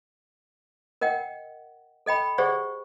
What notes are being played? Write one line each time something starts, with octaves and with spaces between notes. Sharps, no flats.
A#4 D#5 F#5 G5
A4 D#5 G5 B5
G4 G#4 C5 D5 F#5 C#6